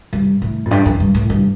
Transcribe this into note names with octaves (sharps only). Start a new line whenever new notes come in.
G2
A2
F2
G2
F2
G2
A2
G2